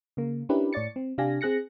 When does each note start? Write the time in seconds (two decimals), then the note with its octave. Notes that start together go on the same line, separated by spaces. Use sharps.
0.17 C#3 A#3
0.49 C#4 D4 E4 G4 A#4 B4
0.73 A2 C#5 D5 A6 C#7
0.96 C4
1.18 C3 D4 G4 F5 G#5 A#6
1.41 C4 G#4 F#6 A#6 C#7